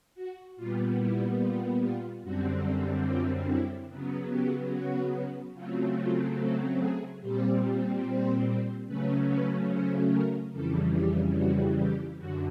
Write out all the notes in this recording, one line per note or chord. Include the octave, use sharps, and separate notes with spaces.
F#4
A#2 G3 B3 F4
E4
F4
F4
F#2 D3 G3 C4 F#4
F4
E4
C#3 F#3 B3
G4
F#4
C#3 F#3 A3 C4 F4
F4
A4
G#4
A#2 G3 C4 G4
C5
C#3 F#3 A3 C#4 B4
B4
C5
A#4
F2 C#3 E3 G3 A4
G4
F#4
G4
F#2 D3 F#4